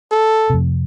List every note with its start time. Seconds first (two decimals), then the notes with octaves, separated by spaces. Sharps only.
0.11 A4
0.50 F2 C3